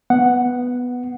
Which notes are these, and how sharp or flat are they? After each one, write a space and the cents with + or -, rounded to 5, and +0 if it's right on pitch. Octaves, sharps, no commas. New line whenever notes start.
B3 +0 F#5 +0